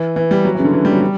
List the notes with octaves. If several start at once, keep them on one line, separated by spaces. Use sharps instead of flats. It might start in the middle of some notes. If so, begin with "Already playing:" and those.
Already playing: E3
E3
G3
F#3
C#3 E3
D3
E3
G3
F#3
G3